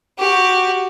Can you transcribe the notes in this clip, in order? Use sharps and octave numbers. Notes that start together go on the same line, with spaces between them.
F#4 G4